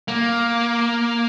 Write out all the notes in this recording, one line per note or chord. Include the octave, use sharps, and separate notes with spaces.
A#3